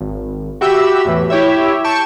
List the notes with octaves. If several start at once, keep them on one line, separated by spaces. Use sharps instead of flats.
G#1
F#4 G4 E5 B5 E6
E2 A2 E3
E4 G4 C#5 E5
G5 A5 C#6 C#7 E7